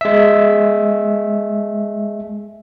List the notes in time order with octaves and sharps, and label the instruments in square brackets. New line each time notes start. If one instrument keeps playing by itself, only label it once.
[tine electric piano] G#3 E5